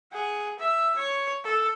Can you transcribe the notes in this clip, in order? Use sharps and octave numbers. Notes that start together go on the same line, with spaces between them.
G#4 F#5
E5 E6
C#5
A4